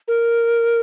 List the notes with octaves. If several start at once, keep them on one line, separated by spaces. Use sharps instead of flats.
A#4